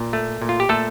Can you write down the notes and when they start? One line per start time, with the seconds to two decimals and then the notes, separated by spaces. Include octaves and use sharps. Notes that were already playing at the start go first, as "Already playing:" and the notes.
Already playing: A#2
0.13 A3
0.42 A#2
0.49 F4
0.60 G4
0.69 A#2 A3 A4